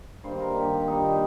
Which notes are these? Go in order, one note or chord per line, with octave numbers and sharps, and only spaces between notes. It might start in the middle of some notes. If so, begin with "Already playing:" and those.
G2 D#3 G3 A#3 C5
A#4
G2 D#3 G3 A#3 G4
A#2 G3 A#3 D#4